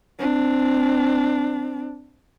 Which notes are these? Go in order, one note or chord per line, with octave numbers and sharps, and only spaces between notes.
C4 D4